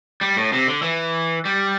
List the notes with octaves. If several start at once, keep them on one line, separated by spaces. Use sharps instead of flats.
G3
A2
C3
D3
E3
G3